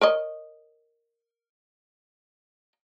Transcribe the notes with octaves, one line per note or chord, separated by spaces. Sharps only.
A#4 C#5 D#5